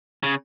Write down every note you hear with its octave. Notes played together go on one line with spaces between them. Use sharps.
C#3